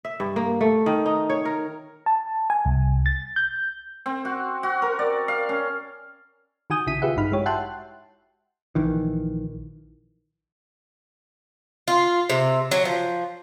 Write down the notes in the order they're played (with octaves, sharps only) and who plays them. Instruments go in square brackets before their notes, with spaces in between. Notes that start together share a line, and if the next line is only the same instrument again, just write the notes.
[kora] E5
G2
A#3
A3
D#3
D#4
C#5
A#4
[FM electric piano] A5
G#5
C2
A6
G6
[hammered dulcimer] C4
F#4
F#4
A#4
D5
F5
C#4
[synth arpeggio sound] D#3 F#4 G#5 D#6 G6
A#1 C#3 E4 B6 D#7
F4 G4 G#4 B4 E5 F#5
A1 G2 D#4 B5 F6
G#3 E4 F#4 G4 C#5
E5 F#5 G5 A5 C6 F#6
[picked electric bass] A#1 D#3 E3
[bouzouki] F4
C3
F#3
F3